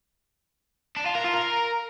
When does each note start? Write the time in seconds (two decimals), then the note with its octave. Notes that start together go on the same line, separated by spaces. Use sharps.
0.97 D4
1.06 F4
1.15 A#4
1.24 F4
1.34 A#4